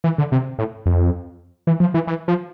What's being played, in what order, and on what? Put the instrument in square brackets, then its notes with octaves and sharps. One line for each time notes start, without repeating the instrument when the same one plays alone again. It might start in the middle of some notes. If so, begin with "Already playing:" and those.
[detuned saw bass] E3
D3
C3
A2
F2
E3
F3
E3
E3
F3